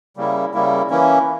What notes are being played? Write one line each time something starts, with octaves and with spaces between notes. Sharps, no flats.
C#3 G3 A#3 E4
C#3 G3 A#3 E4
E3 A#3 C#4 E4